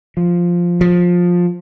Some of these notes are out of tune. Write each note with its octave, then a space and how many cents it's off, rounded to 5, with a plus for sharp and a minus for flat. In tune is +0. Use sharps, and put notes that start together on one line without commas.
F3 +0
F3 +15